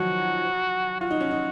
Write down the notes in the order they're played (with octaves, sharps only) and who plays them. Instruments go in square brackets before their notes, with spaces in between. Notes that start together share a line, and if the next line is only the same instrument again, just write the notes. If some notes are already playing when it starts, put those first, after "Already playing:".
Already playing: [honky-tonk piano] D#3 F3 F#3 [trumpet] F#4
[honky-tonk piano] F4 [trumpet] F#4
[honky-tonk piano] D#4
C#4
D#4